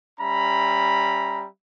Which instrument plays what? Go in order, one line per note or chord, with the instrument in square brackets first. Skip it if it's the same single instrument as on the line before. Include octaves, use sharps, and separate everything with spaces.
[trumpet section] G3 C#4 E5 A#5 B5